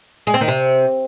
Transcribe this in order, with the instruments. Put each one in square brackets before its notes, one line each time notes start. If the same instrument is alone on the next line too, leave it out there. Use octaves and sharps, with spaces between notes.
[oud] G#3
C4
D#3
C3